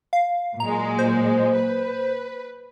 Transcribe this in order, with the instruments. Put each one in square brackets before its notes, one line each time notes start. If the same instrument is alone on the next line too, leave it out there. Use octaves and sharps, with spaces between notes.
[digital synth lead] F5
[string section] A#2 F#3 G#3 [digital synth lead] A#5
[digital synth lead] C5
[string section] B4